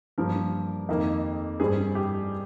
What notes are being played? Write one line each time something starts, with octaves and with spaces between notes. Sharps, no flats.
G2 F3 A#3 A#4
F2 D#3 A#3
G2 G3 C4 G#4
G4